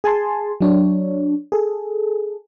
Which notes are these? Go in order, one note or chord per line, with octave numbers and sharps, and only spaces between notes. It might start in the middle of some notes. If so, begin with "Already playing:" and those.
G#4 G#5 A5 C6
F#3 D4 C#5
G#4 A4